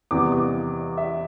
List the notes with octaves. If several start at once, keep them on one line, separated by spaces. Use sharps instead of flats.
E2 C3 E3 G3 D6
D6
E5